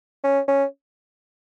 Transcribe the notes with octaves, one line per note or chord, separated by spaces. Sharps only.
C#4
C#4